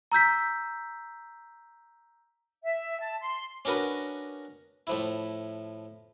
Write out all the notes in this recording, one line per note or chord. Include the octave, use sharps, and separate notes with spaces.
A#5 E6 G6 B6
E5
A5
C6
C#4 D4 F#4 A#4 B4 D#5
A2 F3 E4